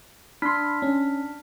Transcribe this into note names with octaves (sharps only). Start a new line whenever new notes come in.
D4 B5 C6 F6 B6
C#4